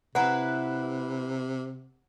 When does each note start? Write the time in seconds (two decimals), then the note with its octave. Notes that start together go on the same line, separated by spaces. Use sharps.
0.15 C3 E4 B4 F#5 A#5